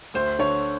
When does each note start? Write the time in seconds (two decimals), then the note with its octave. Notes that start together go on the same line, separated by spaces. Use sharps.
0.14 D2 C5
0.39 D3 C#5